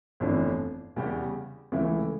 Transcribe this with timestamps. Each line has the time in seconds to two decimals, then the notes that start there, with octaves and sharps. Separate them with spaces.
0.20 G1 F2 E3 A3 D4
0.96 E2 C#3 G3 C#4 G4
1.72 C#2 C#3 E3 A3 E4